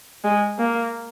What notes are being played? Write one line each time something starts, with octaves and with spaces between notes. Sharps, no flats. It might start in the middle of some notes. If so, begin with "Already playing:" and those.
G#3
A#3